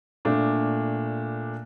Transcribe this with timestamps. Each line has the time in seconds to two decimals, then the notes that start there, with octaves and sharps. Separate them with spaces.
0.25 A#2 A3 D4